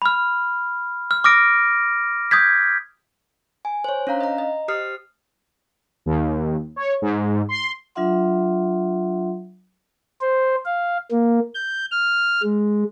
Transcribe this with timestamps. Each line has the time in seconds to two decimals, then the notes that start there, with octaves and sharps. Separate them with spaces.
0.02 B5 F6
1.11 F6
1.24 D6 D#6 F6 A#6 D7
2.31 D#6 G6 G#6 B6
3.65 G#5
3.84 C5 C#5
4.07 C#4 D4 F5 A#5
4.21 D#5 A#5
4.38 D#5
4.68 G4 C5 D#6 F6 C7
6.06 D#2
6.76 C#5
7.02 G#2
7.49 C6
7.95 F#3 D4 F4 E5 F#5 C6
10.21 C5
10.65 F5
11.11 A#3
11.55 G6
11.92 F6
12.43 G#3